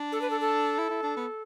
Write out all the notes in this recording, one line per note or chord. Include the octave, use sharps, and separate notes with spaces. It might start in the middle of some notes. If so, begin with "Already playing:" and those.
Already playing: D4
A4
B4
A4
A4
E4
E4
D4
B3